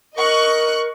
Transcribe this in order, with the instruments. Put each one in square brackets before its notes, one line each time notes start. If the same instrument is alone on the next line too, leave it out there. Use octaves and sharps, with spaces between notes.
[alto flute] A#4 [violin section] D#5 C#6 F#6